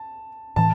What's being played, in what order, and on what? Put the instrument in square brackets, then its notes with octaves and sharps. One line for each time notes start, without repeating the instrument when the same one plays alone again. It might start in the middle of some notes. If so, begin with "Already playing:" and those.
Already playing: [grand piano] A5
[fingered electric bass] A2 E3 [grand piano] A5